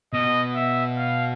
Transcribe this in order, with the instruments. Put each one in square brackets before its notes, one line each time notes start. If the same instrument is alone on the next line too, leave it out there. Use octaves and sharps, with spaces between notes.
[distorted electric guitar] B2 [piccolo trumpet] D#5
[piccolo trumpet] E5
F5